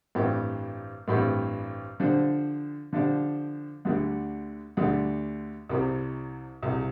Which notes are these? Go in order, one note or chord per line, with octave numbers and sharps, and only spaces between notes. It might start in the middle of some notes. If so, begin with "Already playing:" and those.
A1 G2 G3 C4 G4
A1 G2 G3 C4 G4
D3 F3 D4 G4 C5
D3 F3 D4 G4 C5
D2 D3 G3
D2 D3 G3
C2 C3 G3
C2 C3 G3